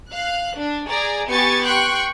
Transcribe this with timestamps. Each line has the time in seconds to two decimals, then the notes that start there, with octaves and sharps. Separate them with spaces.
0.11 F5 F#6
0.57 D4
0.89 G#4 D5 A#5
1.28 B3 G4 G#5 C#6 A6 C#7
1.64 G5 C6 C#6 F#6